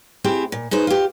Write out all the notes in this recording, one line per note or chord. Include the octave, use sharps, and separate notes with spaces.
C4 E4 G4 G#4
A#2
D#4 G#4 B4 C5
F4 G4